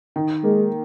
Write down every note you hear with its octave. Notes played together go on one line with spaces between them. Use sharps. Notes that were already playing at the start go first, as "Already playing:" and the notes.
D#3
G#3 A#3